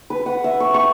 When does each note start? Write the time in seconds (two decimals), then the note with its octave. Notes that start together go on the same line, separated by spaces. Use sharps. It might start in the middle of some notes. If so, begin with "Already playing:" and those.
0.10 B4
0.26 F#5
0.44 E5
0.60 C#6
0.74 C#6